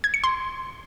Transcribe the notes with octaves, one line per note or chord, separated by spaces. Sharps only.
G#6
C#7
C6